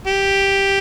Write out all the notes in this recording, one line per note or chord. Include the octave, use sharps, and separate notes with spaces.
G4